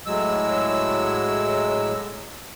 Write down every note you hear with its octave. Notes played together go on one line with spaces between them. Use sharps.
A2 F#3 G#3 E6